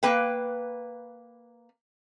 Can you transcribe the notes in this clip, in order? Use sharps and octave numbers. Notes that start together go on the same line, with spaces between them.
A#3 B4 F5 G5